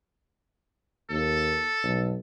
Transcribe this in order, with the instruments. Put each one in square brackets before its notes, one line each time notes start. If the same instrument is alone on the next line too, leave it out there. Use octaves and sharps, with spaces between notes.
[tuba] D#2 [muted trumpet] A4
[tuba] B1